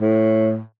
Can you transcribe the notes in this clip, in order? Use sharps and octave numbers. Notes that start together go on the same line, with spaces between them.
A2